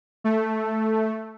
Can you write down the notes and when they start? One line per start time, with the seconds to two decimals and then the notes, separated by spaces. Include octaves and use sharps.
0.24 A3